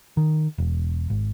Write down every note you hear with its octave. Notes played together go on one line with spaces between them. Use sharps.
D#3
E1
G#1